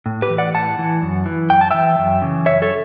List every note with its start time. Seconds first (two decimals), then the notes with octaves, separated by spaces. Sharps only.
0.06 A2
0.22 G4 B4
0.30 E3
0.38 D5 F#5
0.54 A2 F#5 A5
0.79 E3
1.02 F#2
1.26 E3
1.50 F#2 G5
1.61 A5
1.71 E3 E5 G5
1.98 F#2
2.22 C#3 E3
2.46 F#2 C#5 E5
2.62 A4 C#5